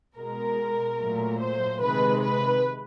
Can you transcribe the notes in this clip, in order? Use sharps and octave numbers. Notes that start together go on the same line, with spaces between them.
B2 G#3 A#4
A#2 F#3 A3
C5
C3 D#3 G#3 B4
B4